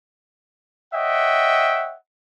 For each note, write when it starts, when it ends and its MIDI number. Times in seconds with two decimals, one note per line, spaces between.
0.93 1.95 73
0.93 1.95 75
0.93 1.95 76
0.93 1.95 78
0.93 1.95 79